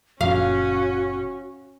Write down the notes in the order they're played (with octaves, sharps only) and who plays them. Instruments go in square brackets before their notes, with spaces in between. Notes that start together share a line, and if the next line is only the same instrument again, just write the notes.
[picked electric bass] F#1 A#2 F3 [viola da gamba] C#4 [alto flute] F#4 [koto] F5